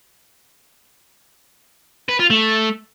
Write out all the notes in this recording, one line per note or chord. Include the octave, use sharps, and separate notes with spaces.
B4
F4
A3